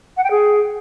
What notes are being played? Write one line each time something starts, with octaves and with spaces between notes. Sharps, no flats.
F#5
G5
G#4